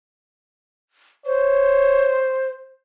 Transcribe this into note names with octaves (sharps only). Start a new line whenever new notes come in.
C5 C#5